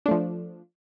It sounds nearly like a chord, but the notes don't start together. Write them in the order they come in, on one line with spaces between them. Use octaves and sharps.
D4 A3 F3